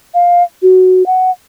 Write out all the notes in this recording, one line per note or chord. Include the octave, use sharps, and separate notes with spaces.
F5
F#4
F#5